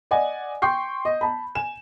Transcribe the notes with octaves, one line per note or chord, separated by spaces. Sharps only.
D5 D#5 F#5 G#5
G5 C6 C#6 G6 C7
D#5
A5 B5
G#5 E7